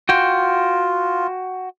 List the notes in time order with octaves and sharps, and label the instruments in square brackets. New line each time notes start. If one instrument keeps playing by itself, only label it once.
[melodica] F4 [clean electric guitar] F#4 G5